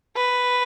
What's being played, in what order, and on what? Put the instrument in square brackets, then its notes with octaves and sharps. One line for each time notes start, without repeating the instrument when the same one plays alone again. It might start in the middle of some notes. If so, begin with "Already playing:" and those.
[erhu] B4